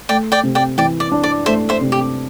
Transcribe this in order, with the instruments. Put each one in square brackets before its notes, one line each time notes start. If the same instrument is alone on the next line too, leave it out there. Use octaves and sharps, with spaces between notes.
[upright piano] A3 [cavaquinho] D5 G5
[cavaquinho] D5 G5
[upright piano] C3
[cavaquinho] D5 G5
[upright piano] E3 [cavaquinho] D5 G5
[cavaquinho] D5
[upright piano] D4
[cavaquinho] D5
[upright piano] A3 [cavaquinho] C5 E5
[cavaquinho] C5 E5
[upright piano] C3
[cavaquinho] G4